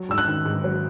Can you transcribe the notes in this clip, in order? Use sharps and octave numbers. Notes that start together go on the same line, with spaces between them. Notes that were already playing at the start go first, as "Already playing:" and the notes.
Already playing: F#3
G#2 E6
F#6
D#3
G#2
F#3